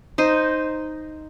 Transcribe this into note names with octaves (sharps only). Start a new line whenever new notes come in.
D#4 C5 D#5